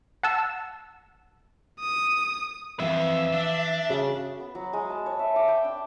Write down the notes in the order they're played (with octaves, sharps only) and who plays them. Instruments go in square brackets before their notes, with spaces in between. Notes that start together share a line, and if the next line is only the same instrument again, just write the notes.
[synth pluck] F#5 A5 E6
[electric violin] D#6
[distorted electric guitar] F2 [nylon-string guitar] E3 F5 [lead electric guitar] E5
[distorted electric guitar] D4
[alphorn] C#3 [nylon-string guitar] F#4
[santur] B3
F#3
G#3
A5
C#5
E5
D6
G5
D4